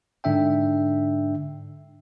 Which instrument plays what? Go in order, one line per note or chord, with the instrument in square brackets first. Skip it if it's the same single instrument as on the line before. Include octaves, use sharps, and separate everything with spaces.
[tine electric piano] G#2 D3 D4 E5 G5